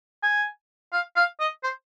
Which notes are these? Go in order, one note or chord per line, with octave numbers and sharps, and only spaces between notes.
G#5
F5
F5
D#5
C5